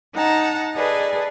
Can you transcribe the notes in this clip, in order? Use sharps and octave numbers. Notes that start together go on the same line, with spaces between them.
D#4 F#5 A5 A#5
G#4 A4 B4 D5 D#5